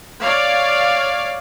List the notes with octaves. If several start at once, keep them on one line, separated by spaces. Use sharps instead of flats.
C#5 D5 F5